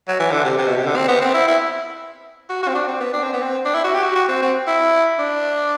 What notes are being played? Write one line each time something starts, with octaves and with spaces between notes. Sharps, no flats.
F#3
E3
D3
C3
C3
B2
C3
D3
C4
B3
C4
E4
E4
F#4
F#4
C4
D4
C4
B3
D4
C4
B3
C4
D4
E4
F#4
G4
F#4
F#4
C4
C4
E4
D4